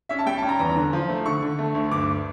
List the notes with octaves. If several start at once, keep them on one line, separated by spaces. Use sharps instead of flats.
C#4 E5
A5
G3 G5
A5
C#4
A#5
E2 A#5
D3
F3
A3
D3 C#6
D3
A3
D2
G2 D6